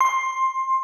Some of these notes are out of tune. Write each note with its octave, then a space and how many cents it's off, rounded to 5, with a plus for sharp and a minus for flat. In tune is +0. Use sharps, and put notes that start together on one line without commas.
C6 +15